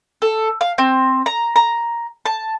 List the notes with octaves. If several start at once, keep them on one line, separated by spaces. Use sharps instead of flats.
A4
F5
C4
A#5
A#5
A5